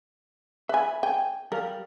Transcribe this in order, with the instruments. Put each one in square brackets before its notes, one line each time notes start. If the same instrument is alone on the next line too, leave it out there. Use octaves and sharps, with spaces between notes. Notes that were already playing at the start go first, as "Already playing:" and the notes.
[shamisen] B4 G#5 [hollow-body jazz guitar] E5 B5
[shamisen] G5 [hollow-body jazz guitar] G#5
[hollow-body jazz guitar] G3 F5 [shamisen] A#4